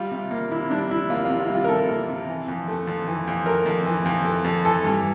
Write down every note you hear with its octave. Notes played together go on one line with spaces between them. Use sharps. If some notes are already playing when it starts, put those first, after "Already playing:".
Already playing: G3 F4
C3
A#3
C3 E4
G3 D4
C3 E4
A#3 F4
C3 F4
F4
G3
F4
A#4
C3 A4
A#3
C3
E3
F2
A3
F2
E3
F2
A3 A#4
F2
E3
F2
A3
F2
E3 A4
G2